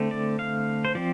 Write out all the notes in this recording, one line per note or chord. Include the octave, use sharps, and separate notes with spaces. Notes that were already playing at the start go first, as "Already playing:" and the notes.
Already playing: D3 A3 C4
D5
F5
C5
F3 C4 D5